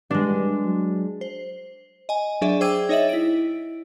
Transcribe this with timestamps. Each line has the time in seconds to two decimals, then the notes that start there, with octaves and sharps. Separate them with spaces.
0.11 G2 G#3 D4
0.62 F#3
1.21 C5
2.09 D#5 G#5
2.41 F#3 D4 G#4 D5 E5
2.61 C5 G5 D6 E6 G#6 D#7
2.89 D#4 C#5 D#5 E5 A6 F#7
3.09 E4 D7